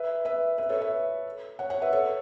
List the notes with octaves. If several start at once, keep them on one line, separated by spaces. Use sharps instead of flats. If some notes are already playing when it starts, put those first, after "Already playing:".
Already playing: B4 E5
B4 E5
B4 E5
A4 C#5
B4 E5
C#5 F#5
C#5 F#5
B4 E5
A4 C#5